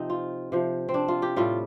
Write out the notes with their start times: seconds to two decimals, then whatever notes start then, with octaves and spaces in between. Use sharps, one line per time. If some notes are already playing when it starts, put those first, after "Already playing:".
Already playing: C3 F3 C4 D#4
0.10 F4
0.52 C3 F3
0.89 C4
0.94 D4
1.08 F4
1.22 G4
1.36 A2 G3 F4